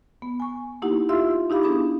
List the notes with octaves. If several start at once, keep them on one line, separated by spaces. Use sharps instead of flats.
B3
G#5 C#6
A#3 D#4 E4 G4 F#5
F4 G4 E5 F5 C6 E6
D#4 E4 G4 F5 B5 D6
B3 D4 G#4 B5 D#6